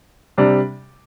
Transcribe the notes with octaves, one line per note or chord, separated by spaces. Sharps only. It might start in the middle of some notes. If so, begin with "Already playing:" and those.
C3 G3 D4